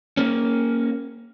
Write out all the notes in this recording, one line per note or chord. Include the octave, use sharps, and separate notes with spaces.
A#3 C#4